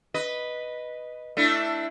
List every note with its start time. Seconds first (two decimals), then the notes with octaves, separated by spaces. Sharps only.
0.14 B4 D#5
1.37 A3 D4 E4